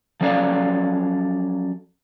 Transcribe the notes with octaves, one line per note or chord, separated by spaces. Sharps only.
F3 F#3 C#4 A4 D5 F5